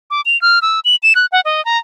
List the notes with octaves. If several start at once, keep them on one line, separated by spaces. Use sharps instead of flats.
D6
F7
F6
E6
F#7
E7
F#6
F#5
D#5
A#5